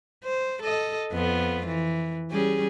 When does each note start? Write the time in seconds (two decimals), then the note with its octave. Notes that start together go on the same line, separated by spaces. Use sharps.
0.24 C5
0.63 A4 D#5
1.12 F2 B3 F4
1.66 E3
2.31 G3 C#4 G#4